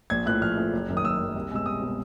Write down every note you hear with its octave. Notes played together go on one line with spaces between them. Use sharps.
A#1 G#6
A2 F3 A3 F#6
A#1 F6
A2 F3 A3
F#1
F#2 D#3
D#6
F#1 E6
F#2 D#3
C2
B2 G#3 E6
C2 D#6
B2 G#3